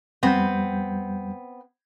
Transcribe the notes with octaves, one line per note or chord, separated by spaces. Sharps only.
F2 G3 B3 C4 G6